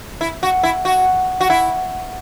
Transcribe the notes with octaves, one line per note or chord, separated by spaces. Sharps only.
E4
F#4
E4
F#4
F#4
E4